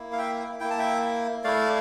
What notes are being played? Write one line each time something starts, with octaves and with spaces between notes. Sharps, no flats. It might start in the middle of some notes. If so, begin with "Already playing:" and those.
Already playing: A#3 E4
F5
E5 G5
A#3 E4 G5
A5
E5 G5
A3 E4 D5 F5